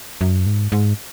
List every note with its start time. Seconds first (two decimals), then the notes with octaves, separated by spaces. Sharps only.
0.21 F#2
0.46 G#2
0.72 G#2